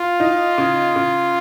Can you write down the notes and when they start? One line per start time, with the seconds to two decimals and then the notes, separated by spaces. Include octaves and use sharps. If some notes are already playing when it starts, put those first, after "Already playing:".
Already playing: F4
0.20 D#4
0.58 C#3
0.96 C#3